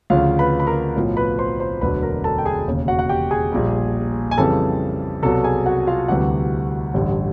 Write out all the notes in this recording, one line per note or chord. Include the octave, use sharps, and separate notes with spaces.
D2 C#3 F3 F4 F5
B4 B5
B5
A#4 A#5
B1 A2 F3
B4 B5
C5 C6
C5 C6
E1 D2 D3 F#3 B4 B5
A#4 A#5
A4 A5
G5
G#4 G#5
E1 D#2 C#3
F#4 F#5
F#5
G4 G5
G#4 G#5
A#1 A#2 G3
G#5
F2 C#3 E3 G3 A4 A5
C2 B2 F#3 A4 A5
G#4 G#5
F#4 F#5
F4 F5
D2 C3 E3 G3 F#4 F#5
A1 G2 D3 G3